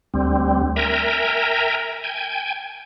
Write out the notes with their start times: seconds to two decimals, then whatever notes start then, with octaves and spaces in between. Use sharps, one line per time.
0.14 D2 G3 C4
0.76 A#4 E5 G5 G#5 A#5
2.04 G5 G#5